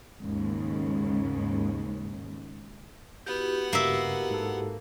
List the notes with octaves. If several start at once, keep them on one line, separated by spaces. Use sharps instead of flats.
D#2 G#2 C#3
B3 E4 F#4 G4 F#5 G6
G2 C#3 A#3 E5
G#2 A4